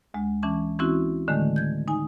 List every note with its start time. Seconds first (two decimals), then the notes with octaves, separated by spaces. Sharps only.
0.14 D2 G#3
0.43 E3 C#4 A5 D6
0.79 E3 C4 C#4 E4 F#4
1.28 A2 D3 D#3 G#3 A3
1.56 G6 G#6
1.88 D#4 G#5